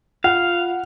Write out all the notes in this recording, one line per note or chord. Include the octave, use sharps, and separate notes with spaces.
F4 F5 F#5